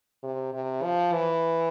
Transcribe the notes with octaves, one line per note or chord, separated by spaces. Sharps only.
C3
C3
F3
E3